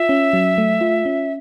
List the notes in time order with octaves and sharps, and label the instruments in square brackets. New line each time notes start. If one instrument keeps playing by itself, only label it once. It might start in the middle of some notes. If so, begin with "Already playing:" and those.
Already playing: [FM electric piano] F4 [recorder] E5
[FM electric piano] C#4
F#3
A3
F4
C#4